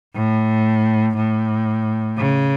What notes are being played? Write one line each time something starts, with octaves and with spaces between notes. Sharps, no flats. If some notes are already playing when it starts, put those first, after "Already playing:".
A2
A2
C#3